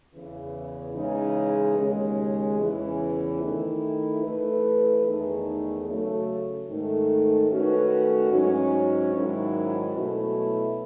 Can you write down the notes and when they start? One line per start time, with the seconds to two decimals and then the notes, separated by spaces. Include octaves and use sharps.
0.14 E2 C#3 E3
0.96 C#3 E3 G#3 D#4 G#4
1.77 D#2 C#3 G#3
2.59 E2 C#3 E3
3.41 D#3 A3 E4
4.23 E3 A3 E4 B4
5.04 E2 D#3 A3 D#4 G#4
5.87 C#3 F#3 A3
6.68 G#2 D#3 A3
7.50 D#3 A3 C#4 F#4 B4
8.31 G#2 F#3 C#4
9.13 G#2 D#3 F#3 C#4 E4
9.96 B2 F#3 A3 E4